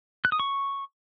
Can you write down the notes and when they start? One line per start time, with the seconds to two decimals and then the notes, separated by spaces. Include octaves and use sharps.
0.25 F#6
0.32 D#6
0.40 C#6